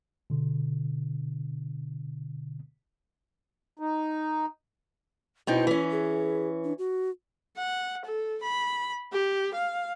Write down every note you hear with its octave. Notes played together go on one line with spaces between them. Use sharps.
B2 D3
D#4
B2 C4 D#4 E4
E3 C#4
G#4
D4
F#4
F#5
A4
B5
G4
F5